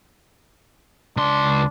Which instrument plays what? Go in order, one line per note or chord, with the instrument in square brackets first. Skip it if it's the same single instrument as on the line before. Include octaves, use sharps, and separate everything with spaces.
[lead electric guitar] C#2 C6 [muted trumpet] D4